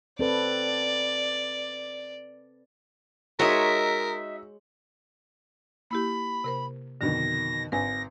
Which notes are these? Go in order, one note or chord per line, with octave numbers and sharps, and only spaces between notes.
C4 A4 B4 D5
G#3 D#4 F#4 A#4 C#5 D#5 E5
A#3 E4 G4 B5
C3 A#4 C5
F2 B2 D3 D#3 A#6
G#1 B4 G#5 A#6